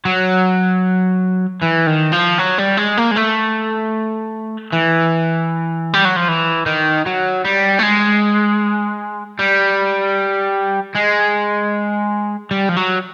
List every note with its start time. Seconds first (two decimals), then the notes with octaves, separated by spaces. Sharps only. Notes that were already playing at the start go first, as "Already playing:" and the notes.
0.05 F#3
1.62 E3
1.87 D#3
2.13 F3
2.39 F#3
2.58 G3
2.77 G#3
2.97 A#3
3.11 G#3
3.16 A3
4.72 E3
5.93 G3
6.05 F#3
6.16 F3
6.28 E3
6.66 D#3
7.06 F#3
7.45 G3
7.79 A3
7.83 G#3
9.39 G3
10.95 G#3
12.51 G3
12.69 F3
12.76 F#3